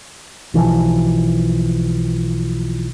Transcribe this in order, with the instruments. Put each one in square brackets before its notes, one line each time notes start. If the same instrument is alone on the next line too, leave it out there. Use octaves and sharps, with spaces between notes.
[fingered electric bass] B1 E3 F3